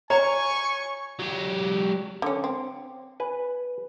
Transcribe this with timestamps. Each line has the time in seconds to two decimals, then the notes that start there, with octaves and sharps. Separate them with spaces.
0.10 C#5 G#5 A#5 C#6
1.19 F#3 G4
2.22 D3 C#4
2.44 C4
3.20 B4 G#5